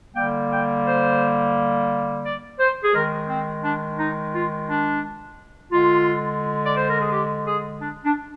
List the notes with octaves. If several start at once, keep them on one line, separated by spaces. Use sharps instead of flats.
D3 G3 A#3 G5
G5
C5
D5
C5
G#4
D#3 G#3 A#4
C4
D4
D#4
F4
D4
D3 G#3 F4
D5
C5
A#4
G#4
G4
G#4
D4
D4